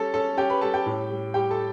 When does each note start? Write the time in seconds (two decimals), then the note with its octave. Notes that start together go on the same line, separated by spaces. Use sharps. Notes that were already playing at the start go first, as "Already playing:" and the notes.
Already playing: G3 C#4 A4 A5
0.14 C#4 A4 A5
0.37 C#4 G4 G5
0.50 B4 B5
0.61 G3 A4 A5
0.74 G4 G5
0.86 A2
1.11 G3
1.34 G3 G4 G5
1.51 A4 A5